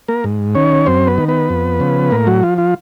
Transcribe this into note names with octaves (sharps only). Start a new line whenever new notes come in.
A#3 A#4
G#2
D#3 C#4 C#5
F#2 C4 C5
B3 B4
D#3
B3 B4
F2
C#3 F3
A2 A#3 A#4
F#3 F#4
F3 F4
F4